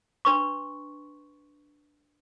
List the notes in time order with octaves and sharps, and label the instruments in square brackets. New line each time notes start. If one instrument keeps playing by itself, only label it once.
[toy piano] D4 B4 C6 C#6